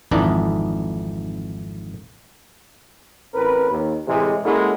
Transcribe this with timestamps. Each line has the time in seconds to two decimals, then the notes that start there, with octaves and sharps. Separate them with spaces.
0.11 G#1 F2 E3 D4 D#4
3.34 A1 C4 A#4 B4
3.70 D#2
4.07 A2 C3 E3 G#3
4.44 G#3 A#3 C#4 E4 F#4 A4